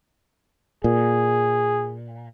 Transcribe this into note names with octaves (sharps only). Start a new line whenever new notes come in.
A#2 G#4